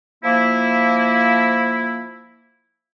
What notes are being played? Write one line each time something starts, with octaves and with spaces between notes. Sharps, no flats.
F3 A#3 E4